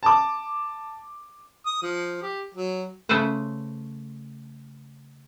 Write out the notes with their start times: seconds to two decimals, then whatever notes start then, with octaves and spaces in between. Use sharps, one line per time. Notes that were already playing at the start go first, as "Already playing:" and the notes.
0.03 A5 D6
1.66 D#6
1.82 F3
2.22 G4
2.54 F#3
3.09 C#3 A3 A4 B4 C5